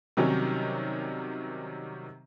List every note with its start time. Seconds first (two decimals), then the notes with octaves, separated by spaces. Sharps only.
0.17 C3 D#3 F#3 G3 C#4